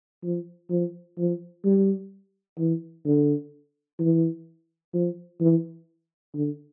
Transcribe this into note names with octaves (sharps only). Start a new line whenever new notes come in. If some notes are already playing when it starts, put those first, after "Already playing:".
F3
F3
F3
G3
E3
D3
E3
F3
E3
D3